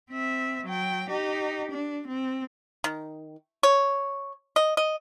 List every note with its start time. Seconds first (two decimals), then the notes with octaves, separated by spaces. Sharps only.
0.10 C4 E5
0.65 F#3 G5
1.09 D#4 G4
1.71 D4
2.07 C4
2.84 D#3
3.63 C#5
4.56 D#5
4.77 D#5